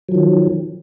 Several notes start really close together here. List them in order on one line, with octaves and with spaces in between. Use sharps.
F#3 F3 D#3